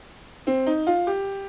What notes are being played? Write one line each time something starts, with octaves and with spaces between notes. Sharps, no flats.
C4
D#4
F4
G4